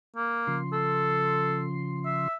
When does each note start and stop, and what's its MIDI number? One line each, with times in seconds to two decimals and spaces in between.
0.16 0.57 58
0.47 2.28 49
0.47 2.28 53
0.47 2.28 84
0.73 1.63 69
2.05 2.35 76